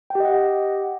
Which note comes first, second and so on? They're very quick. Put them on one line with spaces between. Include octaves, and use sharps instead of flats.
G5 G4 D#5 F#5